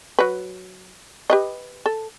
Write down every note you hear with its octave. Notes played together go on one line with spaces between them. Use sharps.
F#3 B4
G4 B4 D#5
A4